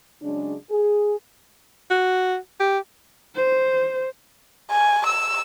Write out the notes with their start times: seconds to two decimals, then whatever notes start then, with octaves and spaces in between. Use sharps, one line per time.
0.22 C#3 F#3 G#3 D4
0.70 G#4
1.91 F#4
2.60 G4
3.35 C5
4.71 G#5
5.07 E6